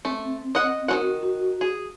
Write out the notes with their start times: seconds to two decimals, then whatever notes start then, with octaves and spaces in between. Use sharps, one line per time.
0.05 A3 C4
0.55 D#5 F#5
0.88 D#3 C#4 F#4 F#5
1.23 F#4
1.61 G#4